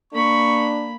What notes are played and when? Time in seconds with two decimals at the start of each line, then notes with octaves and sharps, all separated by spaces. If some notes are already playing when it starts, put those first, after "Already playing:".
0.13 A#3 D4 B5 C#6